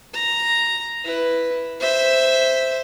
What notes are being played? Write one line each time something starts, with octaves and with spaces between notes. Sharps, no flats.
A#5
E4 B4
C5 E5